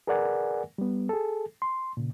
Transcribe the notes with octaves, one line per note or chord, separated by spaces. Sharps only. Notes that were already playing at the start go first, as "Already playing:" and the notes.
G#4 A#4 B4 D5 F#5 G#5
G3 B3
G#4 A4
C6
A#2 C#3